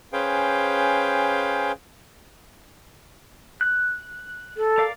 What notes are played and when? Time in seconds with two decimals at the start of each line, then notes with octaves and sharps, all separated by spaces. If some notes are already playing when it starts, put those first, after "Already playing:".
0.13 C#4 G#4 B4 C5 F5 G5
3.61 F#6
4.56 A4
4.78 A#4 D5 F5